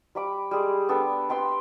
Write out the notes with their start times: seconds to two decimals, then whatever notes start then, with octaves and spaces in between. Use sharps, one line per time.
0.15 G3 B5 D6
0.51 G3 G#3 G#4
0.89 B3 D4 G4 A4
1.29 B4 G5 C6 E6